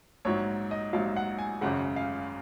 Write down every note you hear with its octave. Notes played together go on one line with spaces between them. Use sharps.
A#1 G#2 F#3 C#5
D#5
A#1 G#2 F#3 F5
F#5
G#5
G#1 F#2 C#3 G#3 F#5
F5